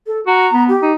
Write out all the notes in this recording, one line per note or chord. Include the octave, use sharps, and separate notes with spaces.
A4
F#4 A#5
B3
G4
D#4